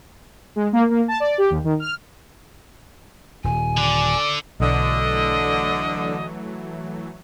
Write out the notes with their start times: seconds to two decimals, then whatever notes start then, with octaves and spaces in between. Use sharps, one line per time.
0.56 G#3
0.73 A#3
0.90 A#3
1.08 A5
1.20 D5
1.38 G4
1.50 D#2
1.64 D#3
1.80 F6
3.44 D#1 G#5
3.77 D3 D5
4.60 B1 D3 E3 F#3 A3 D#5